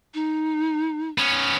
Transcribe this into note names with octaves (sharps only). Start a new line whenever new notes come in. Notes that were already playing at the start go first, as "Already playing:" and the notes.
D#4
B3 C#4